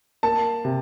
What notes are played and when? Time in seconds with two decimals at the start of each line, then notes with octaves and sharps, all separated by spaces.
0.23 A#3 A5
0.65 C3